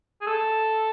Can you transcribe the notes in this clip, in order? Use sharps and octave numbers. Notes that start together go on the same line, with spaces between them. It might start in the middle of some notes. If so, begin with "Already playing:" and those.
G#4
A4